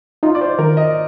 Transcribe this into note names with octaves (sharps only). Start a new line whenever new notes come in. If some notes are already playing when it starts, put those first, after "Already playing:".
D#4 F4
D5
C5
D#3 A#4
D#5